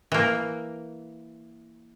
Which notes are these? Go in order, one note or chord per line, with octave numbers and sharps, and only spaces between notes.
E3 A#3